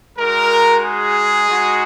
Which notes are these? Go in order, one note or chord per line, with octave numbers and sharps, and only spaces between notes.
G#3 D#4 F#4 A#4
G#4
G#3 D#4 F#4